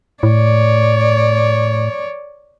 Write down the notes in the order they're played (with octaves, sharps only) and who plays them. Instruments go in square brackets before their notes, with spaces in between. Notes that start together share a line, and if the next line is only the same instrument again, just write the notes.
[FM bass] A2 [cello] C#5 D5